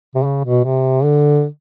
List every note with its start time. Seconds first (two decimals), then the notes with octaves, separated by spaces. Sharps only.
0.15 C3
0.24 C#3
0.45 B2
0.64 C3
1.04 D3